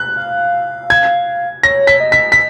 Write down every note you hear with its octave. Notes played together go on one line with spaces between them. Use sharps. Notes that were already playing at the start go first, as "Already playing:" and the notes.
Already playing: F#6
F5
G#6
C#5 A#6
B6
D#5
B6
B6